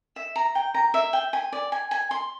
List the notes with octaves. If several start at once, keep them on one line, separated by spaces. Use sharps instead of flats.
E5
A#5
G5
A#5
E5
G5
G#5
D5
G#5
G#5
C6